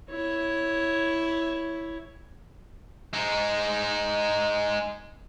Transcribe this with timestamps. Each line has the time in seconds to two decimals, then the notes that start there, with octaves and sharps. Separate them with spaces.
0.10 E4 C#5
3.13 G#3 D#4